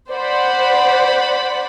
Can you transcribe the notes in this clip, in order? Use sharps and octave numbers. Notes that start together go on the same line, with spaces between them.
C5 D5 F#5 B5